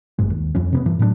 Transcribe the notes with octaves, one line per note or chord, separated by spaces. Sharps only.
G#1 G2 G#3
D#2
F2 F3 C#4
C3 A#3 B3
G2 E3
A2 F#3 G3 D4